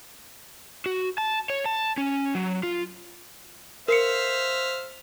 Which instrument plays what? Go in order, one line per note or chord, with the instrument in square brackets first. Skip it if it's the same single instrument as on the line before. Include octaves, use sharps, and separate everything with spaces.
[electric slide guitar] F#4
A5
C#5
A5
C#4
F#3
F4
[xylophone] A#4 C7 C#7 [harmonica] C5 E5 F5